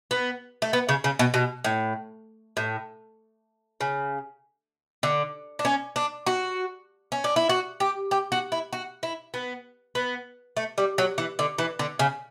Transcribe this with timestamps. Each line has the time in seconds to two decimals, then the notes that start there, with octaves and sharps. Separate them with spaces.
0.11 B3
0.62 A3
0.73 B3
0.89 C#3
1.04 C#3
1.19 B2
1.34 B2
1.64 A2
2.57 A2
3.81 C#3
5.03 D3
5.59 D4
5.65 C#4
5.96 D4
6.26 F#4
7.12 C#4
7.24 D4
7.36 E4
7.49 F#4
7.80 G4
8.11 G4
8.32 F#4
8.52 E4
8.73 F#4
9.03 E4
9.34 B3
9.95 B3
10.57 A3
10.78 G3
10.98 F#3
11.18 E3
11.39 D3
11.58 E3
11.79 D3
11.99 C#3